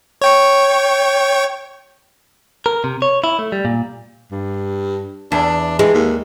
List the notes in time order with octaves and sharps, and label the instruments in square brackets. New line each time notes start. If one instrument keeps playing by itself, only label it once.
[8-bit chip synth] C#5 G5 C#6
[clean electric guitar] A#4
C3
C#5
E4
A3
G3
A#2
[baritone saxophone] G2
[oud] E2 [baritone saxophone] D4
[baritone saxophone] E3 [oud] G#3
[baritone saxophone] D#2